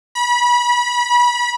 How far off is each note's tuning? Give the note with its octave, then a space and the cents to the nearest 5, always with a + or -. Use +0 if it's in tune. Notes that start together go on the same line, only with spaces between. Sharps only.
B5 -30